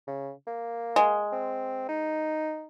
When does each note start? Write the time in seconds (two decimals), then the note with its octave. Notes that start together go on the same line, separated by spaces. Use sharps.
0.07 C#3
0.47 A#3
0.96 G#3
1.32 C4
1.89 D#4